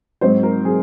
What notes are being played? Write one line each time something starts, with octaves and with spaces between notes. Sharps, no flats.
G#2 F#3 C4 C5
A#4
F#3 C4 G#4